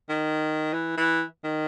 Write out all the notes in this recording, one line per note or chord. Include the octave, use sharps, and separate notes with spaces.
D#3
E3
E3
D#3